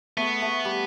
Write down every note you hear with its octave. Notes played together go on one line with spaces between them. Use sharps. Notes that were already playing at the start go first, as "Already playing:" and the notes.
A3 B3
A3
G3